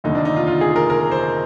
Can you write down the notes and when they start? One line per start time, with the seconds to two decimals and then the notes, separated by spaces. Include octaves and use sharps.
0.04 F1 D#2 D3 D#4
0.15 D4
0.25 D#4
0.36 F4
0.47 F4
0.61 G#4
0.76 A#4
0.90 A#4
1.11 C5